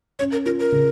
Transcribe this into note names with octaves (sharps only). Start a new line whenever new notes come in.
C#4 C#5
A#4
F4 A#4
A#4
C#3